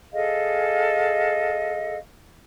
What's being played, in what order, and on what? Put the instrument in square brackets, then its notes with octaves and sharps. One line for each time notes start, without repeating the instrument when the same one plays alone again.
[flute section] G#4 A4 D#5 F5